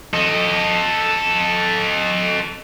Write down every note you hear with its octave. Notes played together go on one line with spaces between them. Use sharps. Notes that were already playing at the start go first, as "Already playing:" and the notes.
A4 D#5